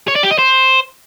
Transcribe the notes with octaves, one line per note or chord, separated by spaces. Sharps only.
C#5
D5
G4
D#5
C5